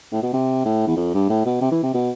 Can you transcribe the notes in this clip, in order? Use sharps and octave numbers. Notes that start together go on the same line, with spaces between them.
A2
B2
C3
A2
E2
F2
G2
A2
B2
C3
E3
C3
B2